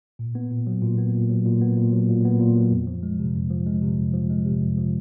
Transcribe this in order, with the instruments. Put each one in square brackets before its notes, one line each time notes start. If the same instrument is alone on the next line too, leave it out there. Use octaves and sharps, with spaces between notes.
[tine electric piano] A#2
B3
A#2
F#3
A#2
B3
A#2
F#3
A#2
B3
A#2
F#3
A#2
B3
A#2
F#3
F2
F3
G#3
C3
F2
F3
G#3
C3
F2
F3
G#3
C3
F2
F3